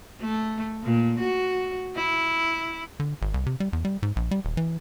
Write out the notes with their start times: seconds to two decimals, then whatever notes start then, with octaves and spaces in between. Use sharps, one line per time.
0.21 A3
0.83 A#2
1.20 F#4
1.96 E4
3.00 D3
3.22 G#1
3.34 C2
3.46 C3
3.60 G3
3.73 E2
3.85 G3
4.03 G#2
4.16 A#1
4.31 G3
4.45 D#1
4.57 E3